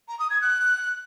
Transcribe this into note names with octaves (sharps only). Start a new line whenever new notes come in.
A#5
D#6
G#6
F#6